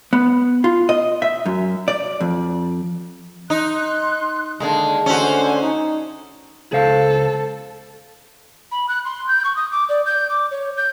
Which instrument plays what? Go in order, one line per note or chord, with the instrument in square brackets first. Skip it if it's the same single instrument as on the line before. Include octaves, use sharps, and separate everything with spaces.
[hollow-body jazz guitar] B3
F4
D#5
E5
F#2
D5
F2
[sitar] D#4 [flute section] C6 F#6
[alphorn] D3 [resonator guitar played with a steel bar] D#3 A#3 D4 [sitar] G#3
[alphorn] D3 [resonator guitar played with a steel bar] A3 [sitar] C#4 F#4 [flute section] C5 G#5
[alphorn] D#4
[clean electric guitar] C#2 C5 F5 [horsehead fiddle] A4
[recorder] B5
F#6
C6
G6
C#6
D#6
D6
D5
G6
D6
C#5
G6